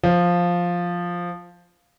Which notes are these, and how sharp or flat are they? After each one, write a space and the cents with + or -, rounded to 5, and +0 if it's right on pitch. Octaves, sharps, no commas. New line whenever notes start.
F3 +5